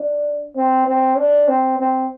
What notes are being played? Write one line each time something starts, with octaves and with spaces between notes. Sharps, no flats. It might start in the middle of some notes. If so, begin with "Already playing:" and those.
Already playing: D4
C4
C4
D4
C4
C4